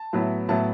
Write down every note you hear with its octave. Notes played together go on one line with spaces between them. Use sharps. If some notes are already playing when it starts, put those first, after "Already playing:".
Already playing: A5
A2 F#3 B3 E4
A2 F#3 B3 E4 A5